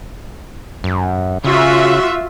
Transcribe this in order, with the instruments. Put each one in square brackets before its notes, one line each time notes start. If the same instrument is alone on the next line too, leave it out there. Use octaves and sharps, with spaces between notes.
[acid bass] F#2
[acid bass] C#3 [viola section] F4 F#4 E5